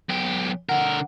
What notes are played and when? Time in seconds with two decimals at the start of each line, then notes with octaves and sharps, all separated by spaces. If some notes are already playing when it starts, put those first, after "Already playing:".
0.09 B1 G4
0.69 D3 A#4 F#5